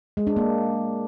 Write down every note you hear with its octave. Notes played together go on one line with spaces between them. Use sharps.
G#3
D4
A#3